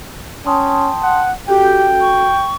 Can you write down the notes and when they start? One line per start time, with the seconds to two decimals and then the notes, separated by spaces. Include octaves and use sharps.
0.46 C#4 G5 A5 C6 D#6
1.02 F#5
1.48 C#4 F#4 G4 A4 G5
2.01 C#6